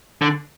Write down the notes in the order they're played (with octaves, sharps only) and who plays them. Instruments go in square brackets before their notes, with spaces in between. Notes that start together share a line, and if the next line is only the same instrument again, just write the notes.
[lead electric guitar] D3